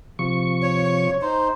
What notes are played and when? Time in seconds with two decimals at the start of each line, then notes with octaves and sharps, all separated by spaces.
0.19 C3 F3 C#6
0.62 C#5
1.22 D#4 C5